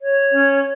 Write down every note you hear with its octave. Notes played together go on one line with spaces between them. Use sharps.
C#5
C#4